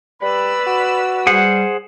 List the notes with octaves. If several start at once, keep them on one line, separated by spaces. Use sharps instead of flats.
G3 B4 D5 B5 E6
F#4
G3 G#4 C5 F#5